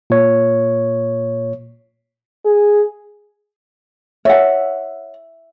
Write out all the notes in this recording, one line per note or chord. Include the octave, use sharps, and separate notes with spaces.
A#2 C#5
G#4
C#5 E5 F#5